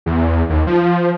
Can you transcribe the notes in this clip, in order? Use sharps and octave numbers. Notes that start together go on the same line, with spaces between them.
E2
D#2
F3